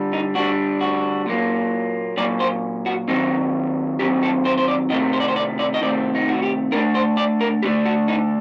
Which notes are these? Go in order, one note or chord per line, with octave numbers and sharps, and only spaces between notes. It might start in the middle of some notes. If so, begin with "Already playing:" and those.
Already playing: D3 G3
D#4
D3 G3 D4 F#4
F#4
A#2 F#3 A#3
A#2 F#3 A#3 D5
C5
F#4
D#3 F#3 C4 D#4
D#3 F#3 C4 G4
A4
C5
C5
D5
C3 D#3 A3 C4 D#5
C5
D5
C5
D5
D5
D#5
C3 D#3 A3 C4 D5
D#4
F#4
G4
D3 A3 D4 A#4
C5
D5
A#4
D3 A3 D4 G4
F#4
D#4